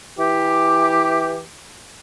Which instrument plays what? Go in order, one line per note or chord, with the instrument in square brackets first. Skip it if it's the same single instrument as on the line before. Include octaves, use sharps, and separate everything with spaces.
[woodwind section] E3 G4